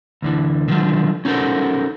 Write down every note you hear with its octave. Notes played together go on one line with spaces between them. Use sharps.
D2 D3 E3
D3 D#3 F3 F#3
C#4 D#4 F#4 A4 A#4 C5